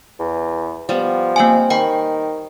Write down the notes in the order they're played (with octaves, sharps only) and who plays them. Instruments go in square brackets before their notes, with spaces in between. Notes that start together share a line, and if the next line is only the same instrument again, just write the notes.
[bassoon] E2
[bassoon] F3 [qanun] G3 B3
[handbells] A#3 G#5 [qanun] C4 B5 D6
[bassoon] D#3 [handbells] G5 [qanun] B5 C#6